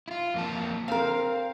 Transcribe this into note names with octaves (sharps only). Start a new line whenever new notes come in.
E4 F4
F2 A#3 A5
C4 A#4 F5